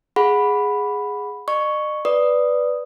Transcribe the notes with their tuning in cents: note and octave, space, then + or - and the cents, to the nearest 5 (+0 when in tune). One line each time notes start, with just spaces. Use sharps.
G#4 +0 F#5 -15 B5 +0
D#5 -45 C#6 +5
B4 +0 D5 +0 D#6 +0